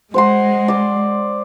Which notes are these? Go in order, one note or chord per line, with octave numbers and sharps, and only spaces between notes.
G#3 C5 F#5 C6
D5 C6